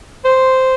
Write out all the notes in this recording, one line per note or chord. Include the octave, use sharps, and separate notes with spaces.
C5